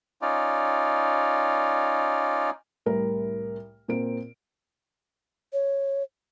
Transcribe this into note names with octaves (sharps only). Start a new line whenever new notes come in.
C#4 D#4 F4 D5
C2 A2 A#4
A#2 C4 A#4 D7
C#5